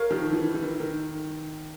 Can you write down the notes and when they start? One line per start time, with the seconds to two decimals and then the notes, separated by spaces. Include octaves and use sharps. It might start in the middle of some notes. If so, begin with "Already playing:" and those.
Already playing: A#4 C#5 F5
0.11 D#3 F3
0.32 E3
0.54 E3
0.63 D#3
0.80 D#3